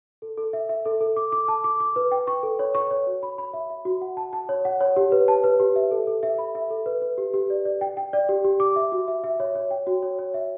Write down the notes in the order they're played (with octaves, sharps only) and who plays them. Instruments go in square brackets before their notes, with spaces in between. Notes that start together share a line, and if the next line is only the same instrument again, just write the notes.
[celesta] A4
A4
E5
E5
A4
A4
D6
D6
A5
D6
D6
B4
G5
C#6
A4
C#5
C#6
C#5
F#4
B5
B5
E5
E5
F#4
F#5
A5
A5
C#5
F#5
C#5
G4
B4
A5
B4
G4
E5
A4
A4
E5
B5
E5
A4
B4
B4
G4
G4
D5
D5
G5
G5
D5
G4
G4
D6
E5
F#4
E5
E5
C#5
C#5
G5
F#4
C#5
C#5
E5